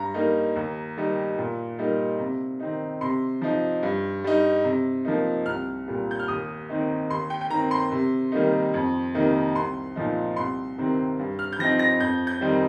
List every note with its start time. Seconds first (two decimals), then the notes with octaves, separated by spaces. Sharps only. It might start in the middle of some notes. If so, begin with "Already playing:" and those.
Already playing: G2 A#5
0.14 G3 A#3 D#4
0.56 D#2
0.97 D#3 G3 D#4
1.38 A#2
1.78 G3 A#3 D#4
2.19 C3
2.60 D#3 C4 D#4
3.01 C3 C6
3.42 F3 D#4
3.83 G2
4.24 G3 D#4
4.64 C3
5.05 F3 A#3 D#4
5.46 C2 F6
5.88 A#2 G3
6.11 G6
6.19 F6
6.28 D#2 D#6
6.69 D#3 C4 D#4
7.10 D#2 C6
7.30 G5
7.41 G5
7.50 D#3 C4 A#5
7.71 C6
7.91 C3
8.32 D#3 G3 A#3 D#4
8.74 F2
9.15 C3 D#3 A#3 D#4
9.55 C2 C6
9.96 A#2 F3 D#4
10.36 C2 C6
10.78 C3 D#3 C4
11.19 G2
11.39 F6
11.53 G6
11.59 F3 C4 D#4 A#6
11.79 A#6
12.00 F2 G6
12.27 G6
12.41 D#3 G3 C4 D#4